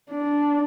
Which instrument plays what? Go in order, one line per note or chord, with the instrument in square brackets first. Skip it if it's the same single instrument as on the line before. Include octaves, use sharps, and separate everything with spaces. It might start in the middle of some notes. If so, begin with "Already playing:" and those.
[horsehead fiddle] D4